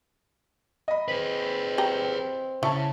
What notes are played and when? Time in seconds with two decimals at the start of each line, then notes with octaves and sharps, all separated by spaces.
0.88 D#5 B5
1.08 C4 G#4 B4
1.78 G4 G5 A#5
2.63 C#3 E4 C#5 A5 C#6